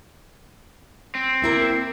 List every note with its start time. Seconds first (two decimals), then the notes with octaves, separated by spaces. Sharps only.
1.15 C4
1.42 A#3 E4 A#4